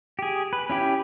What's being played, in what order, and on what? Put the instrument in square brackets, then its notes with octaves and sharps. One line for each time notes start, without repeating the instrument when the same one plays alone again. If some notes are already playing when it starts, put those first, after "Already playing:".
[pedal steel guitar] G4 G#4
B4
C#4 E4 G4